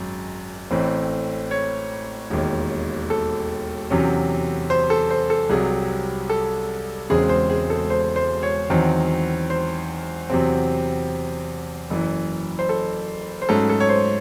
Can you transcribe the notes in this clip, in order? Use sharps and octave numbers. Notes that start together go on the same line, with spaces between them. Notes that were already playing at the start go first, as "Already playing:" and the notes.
Already playing: G#1 F#2 G#3
A1 A2 E3 C4
C#5
E1 D#2 D#3
A4
E2 C3 F#3 C#4
C5
A4
C5
A4
C2 C3 F#3 G#4
A4
E1 E2 C#3 G#3 C4 G#4
C5
G#4
A4
C5
C5
C#5
E2 D#3 F#3 C4
C5
E2 C3 F#3 C4
F#1 F#2 E3
C5
A4
C5
G#2 F#3 A3 C#4 A4
A4
C#5
C5